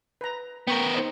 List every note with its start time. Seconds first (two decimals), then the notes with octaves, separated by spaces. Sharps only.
0.21 B4 A#5
0.67 B3 A#4 G5 C#6
0.94 D#4 C5 D#5